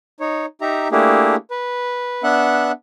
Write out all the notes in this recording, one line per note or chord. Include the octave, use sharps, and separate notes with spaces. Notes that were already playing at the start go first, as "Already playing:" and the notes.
D#4 C#5
D#4 G4 E5 A#5
A3 A#3 D4 E4 G4 G#4
B4
B3 D4 E5 F#5 F#6